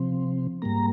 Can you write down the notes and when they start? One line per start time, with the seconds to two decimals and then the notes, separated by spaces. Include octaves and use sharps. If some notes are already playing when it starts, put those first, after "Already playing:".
Already playing: C3 F3 C4
0.62 G#2 G3 A#3 A#5